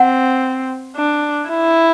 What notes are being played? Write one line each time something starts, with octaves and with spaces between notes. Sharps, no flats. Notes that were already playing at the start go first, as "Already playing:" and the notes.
Already playing: C4 F#5
D4
E4